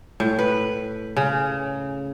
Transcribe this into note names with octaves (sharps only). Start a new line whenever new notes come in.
A2
B4
C#3